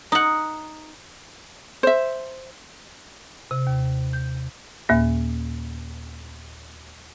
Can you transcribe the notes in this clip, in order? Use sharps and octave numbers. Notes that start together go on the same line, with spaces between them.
D#4 F#5
C5 E5
C3
D#2
G6
D#2 A#2 A#3